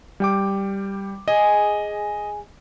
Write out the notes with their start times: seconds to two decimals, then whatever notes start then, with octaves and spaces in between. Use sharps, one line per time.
0.20 G3 G5 D6
1.28 G#4 D#5